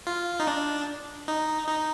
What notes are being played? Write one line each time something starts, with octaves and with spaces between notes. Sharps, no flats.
F4
D#4
D4
D#4
D#4